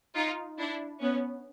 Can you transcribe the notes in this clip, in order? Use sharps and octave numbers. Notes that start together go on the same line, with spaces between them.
D#4 F4
D4 E4
B3 C#4